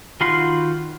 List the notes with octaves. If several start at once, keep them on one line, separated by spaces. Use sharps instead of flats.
D#3 F4 F#4 B5 C6